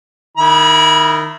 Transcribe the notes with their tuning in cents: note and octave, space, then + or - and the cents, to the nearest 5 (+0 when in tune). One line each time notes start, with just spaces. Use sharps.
D#3 -15 E4 +0 B5 -35